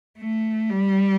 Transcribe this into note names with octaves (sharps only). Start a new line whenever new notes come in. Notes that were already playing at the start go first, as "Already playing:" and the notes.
A3
G3